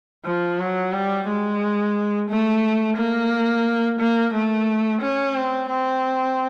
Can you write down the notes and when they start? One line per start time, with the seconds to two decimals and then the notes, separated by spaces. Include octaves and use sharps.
0.25 F3
0.59 F#3
0.92 G3
1.27 G#3
2.29 A3
2.96 A#3
3.99 A#3
4.33 A3
5.01 C#4
5.35 C4
5.69 C4